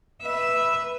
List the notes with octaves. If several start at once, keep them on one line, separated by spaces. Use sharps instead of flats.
B4 E5